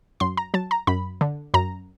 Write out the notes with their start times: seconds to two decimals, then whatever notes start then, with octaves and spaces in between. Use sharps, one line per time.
0.20 F#2 C6
0.37 A#5
0.54 F#3 A5
0.71 A#5
0.87 F#2 B5
1.21 D3
1.54 F#2 A#5